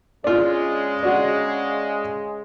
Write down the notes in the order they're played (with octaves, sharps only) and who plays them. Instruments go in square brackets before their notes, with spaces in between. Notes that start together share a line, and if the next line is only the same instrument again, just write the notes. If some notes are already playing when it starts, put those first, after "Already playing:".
[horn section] C#3 G#3 [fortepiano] D4 F4
[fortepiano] D4 F#4 F#5